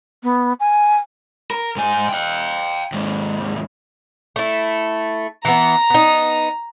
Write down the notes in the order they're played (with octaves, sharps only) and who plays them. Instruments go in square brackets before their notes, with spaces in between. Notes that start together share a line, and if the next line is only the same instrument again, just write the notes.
[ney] B3
G#5
[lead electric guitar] A#4
G#2 G#5
F5 G5
D#2 G#2
[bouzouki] A3 E4
[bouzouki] E3 B3 [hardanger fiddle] A#5
[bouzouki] B3 D#4